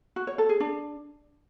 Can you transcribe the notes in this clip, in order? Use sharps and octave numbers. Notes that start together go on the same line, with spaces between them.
F#4
C#5
A4
G#4
D4